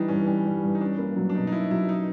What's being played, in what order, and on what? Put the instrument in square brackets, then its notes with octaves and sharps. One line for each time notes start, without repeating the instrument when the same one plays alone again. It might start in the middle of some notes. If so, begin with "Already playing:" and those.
Already playing: [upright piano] E3 G3 [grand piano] D4 D#4
[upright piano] G2 [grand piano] C#4
[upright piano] G3 [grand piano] C#4
[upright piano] G3
G2
[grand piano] D#4
[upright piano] C#4 [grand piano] D4
[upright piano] A#3
F#3
[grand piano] D4
[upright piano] B2 [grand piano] D#4
[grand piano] D#4
[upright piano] C#4 [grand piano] E4
[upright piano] F#3 [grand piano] E4
[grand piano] D#4